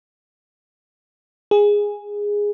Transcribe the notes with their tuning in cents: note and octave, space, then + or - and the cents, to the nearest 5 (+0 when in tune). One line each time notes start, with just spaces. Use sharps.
G#4 -10